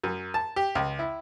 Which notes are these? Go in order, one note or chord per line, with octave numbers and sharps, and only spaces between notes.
F#2
A5
G4
C#2
E4